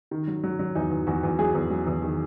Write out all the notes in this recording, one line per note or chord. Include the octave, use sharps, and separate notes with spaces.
D#3
F#3
F#3
F#3
E2 D#4
E2
E2 F#4
E2
F#3 G#4
E2
F#3
E2
D#3